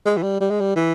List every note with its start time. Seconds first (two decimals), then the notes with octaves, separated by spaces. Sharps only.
0.06 G#3
0.17 E3
0.23 G3
0.41 G3
0.50 G#3
0.60 G3
0.76 E3